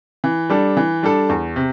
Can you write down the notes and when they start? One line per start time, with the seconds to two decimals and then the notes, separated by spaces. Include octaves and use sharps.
0.24 E3
0.50 G3 D4 A4
0.77 E3
1.03 G3 D4 A4
1.29 E2
1.56 C3